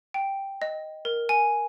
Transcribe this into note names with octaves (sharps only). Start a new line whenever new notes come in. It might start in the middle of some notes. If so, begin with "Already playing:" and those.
G5
D#5
A#4
G#5